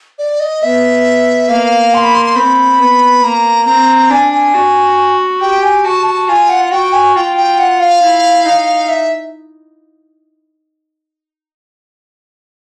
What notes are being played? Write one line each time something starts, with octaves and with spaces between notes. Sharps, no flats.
D5
D#5
B3 E5
A#3 F5
C6
B5
C6
C6
C4 B5
B3
A#3 A#5
C4 A#5
D4 G#5
G#5
F#4
G4 G5
G#5
F#4 A5
A5
F4 G#5
F#5
F#5
F#4 G5
G#5
F4 G5
G5
F#5
F5
E4
D#4
E5